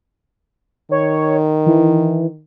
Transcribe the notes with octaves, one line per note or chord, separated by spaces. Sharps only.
D#3 C#5
E3